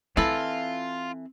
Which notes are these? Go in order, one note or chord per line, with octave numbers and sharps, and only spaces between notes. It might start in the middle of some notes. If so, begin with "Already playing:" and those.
E3 C4 F4 A4